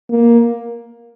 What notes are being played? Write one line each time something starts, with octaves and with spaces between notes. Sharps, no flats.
A#3